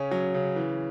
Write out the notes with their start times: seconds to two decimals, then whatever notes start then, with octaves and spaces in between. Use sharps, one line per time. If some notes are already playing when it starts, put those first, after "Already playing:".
Already playing: C#3 C#4
0.11 F#3
0.34 C#3
0.56 E3